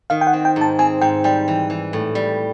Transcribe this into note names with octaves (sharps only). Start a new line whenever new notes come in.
D#3 F5
G5
F#5
C4
G5
G#2
A5
C4 G#5
G#2 G5
G3 G5
E3
E3
A2
G3